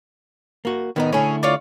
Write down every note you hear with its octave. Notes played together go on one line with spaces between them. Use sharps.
A#3 F#4
A2 D#3 B3 D#4
D3 A3 C#4 E4 G#4
F4 C#5 D5